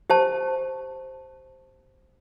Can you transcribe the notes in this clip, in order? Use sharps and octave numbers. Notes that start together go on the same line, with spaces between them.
G4 C5 A5